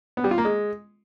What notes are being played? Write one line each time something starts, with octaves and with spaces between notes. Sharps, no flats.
B3
G3
F4
A#3
G#3